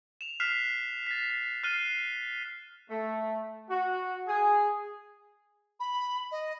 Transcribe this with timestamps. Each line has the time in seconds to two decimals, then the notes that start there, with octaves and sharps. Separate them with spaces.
0.21 E7 F7
0.40 F6 F#6 B6 C7 E7 F7
1.07 A6 B6
1.30 B6
1.63 F6 F#6 A6 C7 D#7 G7
2.90 A3
3.70 F#4
4.27 G#4
5.80 B5
6.31 D#5